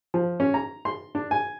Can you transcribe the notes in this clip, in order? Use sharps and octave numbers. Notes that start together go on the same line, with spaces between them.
F3
C#4
A#5
C6
D4
G#5